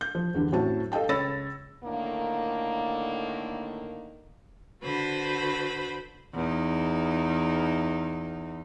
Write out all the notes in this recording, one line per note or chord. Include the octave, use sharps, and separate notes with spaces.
G6
F3
E2 G2 D3
F#2 A2 C4 F#4 A5
A4 D#5 F5 G5 A5
C#2 C#5 B5 E6 A6 A#6
A2 D3 D#3 A#3
D3 F#4 B4 C5 B5
E2 D#4